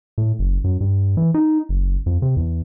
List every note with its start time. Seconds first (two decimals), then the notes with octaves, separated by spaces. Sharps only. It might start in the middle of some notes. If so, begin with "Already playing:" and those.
0.18 A2
0.39 F#1
0.64 F#2
0.81 G2
1.17 E3
1.34 D#4
1.69 F#1
2.06 F2
2.22 C3
2.36 E2